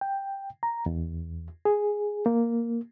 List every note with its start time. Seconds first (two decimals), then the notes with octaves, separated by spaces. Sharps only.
0.01 G5
0.63 A#5
0.86 E2
1.65 G#4
2.26 A#3